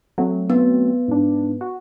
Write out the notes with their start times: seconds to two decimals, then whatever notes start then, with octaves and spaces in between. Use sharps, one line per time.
0.18 F#3 A3 C4
0.50 B3
1.08 G#2 D4
1.61 F#4